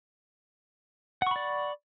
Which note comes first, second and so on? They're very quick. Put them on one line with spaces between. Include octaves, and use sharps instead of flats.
F#5 C#6 B5 D5